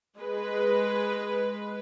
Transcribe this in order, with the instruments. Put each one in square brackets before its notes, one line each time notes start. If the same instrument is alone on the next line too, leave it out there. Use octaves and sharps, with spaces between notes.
[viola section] G#3 B4